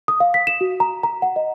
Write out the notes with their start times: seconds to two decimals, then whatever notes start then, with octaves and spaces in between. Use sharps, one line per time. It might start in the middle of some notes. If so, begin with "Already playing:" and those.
0.08 D#6
0.20 F5
0.34 B6
0.47 E7
0.61 F#4
0.80 A#5
1.03 A#5
1.22 F#5
1.36 D#5